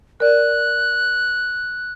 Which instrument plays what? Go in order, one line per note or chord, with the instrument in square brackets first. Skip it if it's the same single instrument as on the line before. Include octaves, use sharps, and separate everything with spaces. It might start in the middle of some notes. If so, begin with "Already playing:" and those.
[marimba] A#4 D5 [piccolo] F#6